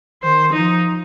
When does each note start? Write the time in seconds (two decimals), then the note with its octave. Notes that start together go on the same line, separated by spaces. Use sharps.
0.23 D#3 C5
0.53 F3 D#4